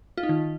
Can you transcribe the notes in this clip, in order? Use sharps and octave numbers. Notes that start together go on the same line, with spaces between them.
F4
D#4
D#3